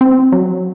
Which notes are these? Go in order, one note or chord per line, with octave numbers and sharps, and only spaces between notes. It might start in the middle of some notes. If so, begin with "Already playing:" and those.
C4
F#3